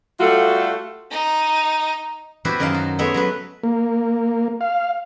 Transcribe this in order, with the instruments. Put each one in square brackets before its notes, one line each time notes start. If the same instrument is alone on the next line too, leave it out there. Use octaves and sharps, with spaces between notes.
[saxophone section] G3 A3 F4 F#4 A4
[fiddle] D#4
[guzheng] B3 E4 F#4 G4 B4 C5
F#2 D#3 A#4 D#5 F5 A5
F#4
G#3 A3 B3 C#5 E5
F#3 B3 B4
[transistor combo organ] A#3
F5